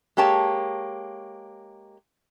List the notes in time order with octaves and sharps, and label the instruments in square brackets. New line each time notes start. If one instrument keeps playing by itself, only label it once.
[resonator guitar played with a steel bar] G#3 A#3 G4 C#5 A5